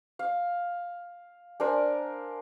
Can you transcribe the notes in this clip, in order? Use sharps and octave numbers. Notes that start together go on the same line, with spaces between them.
F5
D4 A#4 C5 G#5